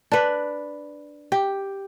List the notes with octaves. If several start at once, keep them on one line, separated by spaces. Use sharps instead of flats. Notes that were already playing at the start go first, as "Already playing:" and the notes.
D4 B4
G4